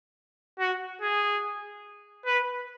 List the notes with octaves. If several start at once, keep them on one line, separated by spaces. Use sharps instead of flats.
F#4
G#4
B4